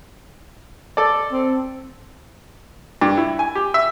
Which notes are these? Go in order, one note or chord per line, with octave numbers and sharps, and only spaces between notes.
A4 D5
C4
G2
E4
G#5
G4
E5